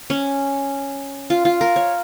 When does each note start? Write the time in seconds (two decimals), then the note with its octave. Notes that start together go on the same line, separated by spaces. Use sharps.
0.10 C#4
1.30 F4
1.45 F4
1.61 A#4
1.76 C#5